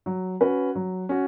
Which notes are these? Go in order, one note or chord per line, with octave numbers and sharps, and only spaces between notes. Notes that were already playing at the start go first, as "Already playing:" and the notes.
F#3
C#4 F#4 B4
F#3
C#4 F#4